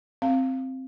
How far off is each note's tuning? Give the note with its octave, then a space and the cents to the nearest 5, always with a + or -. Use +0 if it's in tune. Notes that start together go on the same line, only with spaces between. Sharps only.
C4 +0 F5 +0